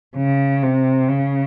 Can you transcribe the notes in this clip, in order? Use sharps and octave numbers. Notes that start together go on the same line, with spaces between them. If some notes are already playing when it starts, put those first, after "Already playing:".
C#3
C3
C#3